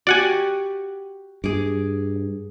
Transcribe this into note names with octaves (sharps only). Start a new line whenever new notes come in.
F#4 G4 D5 F#5 G#5
G2 G#4 D6